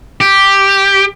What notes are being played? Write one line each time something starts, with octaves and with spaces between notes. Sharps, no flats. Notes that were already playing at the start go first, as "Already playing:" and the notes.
G4